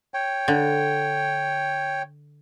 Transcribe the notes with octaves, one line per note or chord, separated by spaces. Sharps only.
C#5 G5
D3